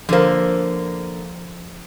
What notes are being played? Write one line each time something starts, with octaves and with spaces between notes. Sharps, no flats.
D3 F3 A#3 C5